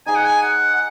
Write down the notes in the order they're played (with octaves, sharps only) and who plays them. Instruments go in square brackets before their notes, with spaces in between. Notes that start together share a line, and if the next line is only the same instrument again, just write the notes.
[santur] D#4 G#4 D#5 [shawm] G#5
[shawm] F#5
G#5
F#5
F#5